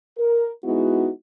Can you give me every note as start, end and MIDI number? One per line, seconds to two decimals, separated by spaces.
0.18 0.49 70
0.64 1.09 56
0.64 1.09 59
0.64 1.09 63
0.64 1.09 64
0.64 1.09 66